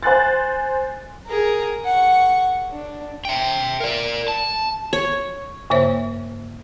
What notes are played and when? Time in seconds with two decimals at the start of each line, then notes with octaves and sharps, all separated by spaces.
0.03 C5 G#5 F#6 A6
1.26 G#4 A#4
1.85 F#5 C#6
2.72 D4
3.25 E5 G5
3.80 A#4 D5
4.28 A5
4.93 C#5
5.70 G2 C#3 A#3 C5 C#5 E5